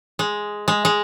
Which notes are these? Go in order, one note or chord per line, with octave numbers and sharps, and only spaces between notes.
G#3
G#3
G#3